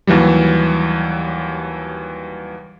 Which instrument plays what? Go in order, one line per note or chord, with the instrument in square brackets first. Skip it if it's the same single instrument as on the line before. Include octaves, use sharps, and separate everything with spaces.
[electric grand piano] D#2 E3 F#3 G3